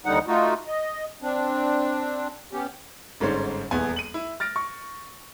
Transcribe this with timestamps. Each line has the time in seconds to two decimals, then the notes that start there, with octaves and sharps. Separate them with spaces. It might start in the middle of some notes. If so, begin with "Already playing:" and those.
0.06 D#2 D3 G3 D#4 F#5
0.28 A3 D#4 F4 F#4
0.67 D#5
1.22 C4 D4
2.53 B3 C#4 G4
3.20 G1 G#2 D3 C#4 C5
3.71 D#1 E2 B3 G#5
3.96 D#7 F#7
4.14 E4
4.40 F6 A6 A#6 D7
4.56 C#6